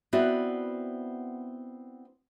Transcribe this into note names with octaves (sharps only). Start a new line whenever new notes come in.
B3 C4 E4 F#4 D5